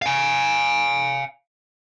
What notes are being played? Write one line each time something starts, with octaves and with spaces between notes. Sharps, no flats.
F5 G#5